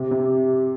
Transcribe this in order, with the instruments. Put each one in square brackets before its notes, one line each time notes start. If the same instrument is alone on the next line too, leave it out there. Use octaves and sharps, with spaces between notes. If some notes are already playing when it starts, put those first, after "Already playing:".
Already playing: [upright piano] C3 [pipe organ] G4
[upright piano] C3